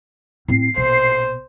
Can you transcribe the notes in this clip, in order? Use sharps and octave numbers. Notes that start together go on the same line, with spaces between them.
A2 C4 C7
A#1 B2 C5